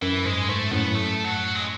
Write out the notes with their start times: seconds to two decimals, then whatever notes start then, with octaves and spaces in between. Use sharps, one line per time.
0.02 F#2 E3
0.25 G#2 G#3
0.49 G#2 A3
0.71 F#2 A2 B3
0.95 A3
1.24 F#3
1.55 G#3